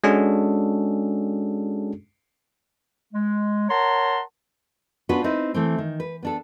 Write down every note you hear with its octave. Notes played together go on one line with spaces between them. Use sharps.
G#3 C#4 D4 F#4 G#4 A4
G#3
A#4 C#5 F#5 A5 A#5 C6
B3 C#4 D4 F4 F#4 B4
C4 D#4 E4 B4
E3 A3 C4
D#3
B4
B3 D4 A4